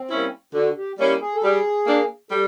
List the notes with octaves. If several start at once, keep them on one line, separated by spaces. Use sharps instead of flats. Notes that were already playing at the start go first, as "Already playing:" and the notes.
Already playing: C4
G3 A#3 C#4 E4
D3 F#4
G4
G3 A#3 C#4 E4 G4
G#4
A4
G3 G#4
A#3 D4
G3 A4